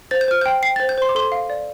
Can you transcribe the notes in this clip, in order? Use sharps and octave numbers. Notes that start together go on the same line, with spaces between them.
C5 A6
G6
C5 F6
G5 G6
G5 C7
C5 A6
G6
C5 C6
D6
A4 C6
F5
D5